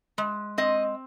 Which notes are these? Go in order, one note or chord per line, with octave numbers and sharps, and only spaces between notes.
G#3
C4 D#5